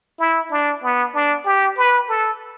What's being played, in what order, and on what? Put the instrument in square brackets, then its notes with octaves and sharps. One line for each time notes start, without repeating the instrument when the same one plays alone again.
[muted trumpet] E4
D4
B3
D4
G4
B4
A4